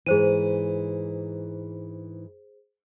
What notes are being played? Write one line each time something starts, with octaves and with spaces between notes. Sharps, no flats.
G#2 E3 G#4 C5 D#7